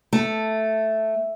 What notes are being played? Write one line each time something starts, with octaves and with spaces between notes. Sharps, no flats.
A3